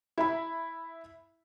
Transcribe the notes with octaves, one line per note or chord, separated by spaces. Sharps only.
E4 E5 B5